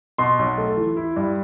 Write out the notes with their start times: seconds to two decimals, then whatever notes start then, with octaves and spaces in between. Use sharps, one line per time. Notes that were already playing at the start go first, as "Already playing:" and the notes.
0.18 B2 C6
0.39 B1
0.58 A3
0.77 E3
0.96 E4
1.16 G2